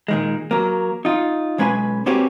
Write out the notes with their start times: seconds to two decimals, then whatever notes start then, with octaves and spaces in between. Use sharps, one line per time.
0.08 A#2 D#3 G#3
0.51 F#3 A#3
1.05 D#4 F4
1.58 B1 G#3 C#4 B4 F#5 G#5
2.06 A#3 C4 C#4 F#4 G4 B4